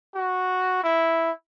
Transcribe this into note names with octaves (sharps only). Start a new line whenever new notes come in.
F#4
E4